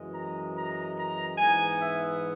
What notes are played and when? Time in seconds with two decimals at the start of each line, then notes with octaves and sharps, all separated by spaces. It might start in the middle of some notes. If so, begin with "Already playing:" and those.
Already playing: F#2 E3 G#3
0.12 A#5
0.55 A#5
0.96 A#5
1.38 G#2 E3 B3 G#5
1.80 E5